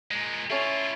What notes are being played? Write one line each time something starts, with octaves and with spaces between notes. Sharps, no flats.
A#2 G#3
A3 C#4 E4 F4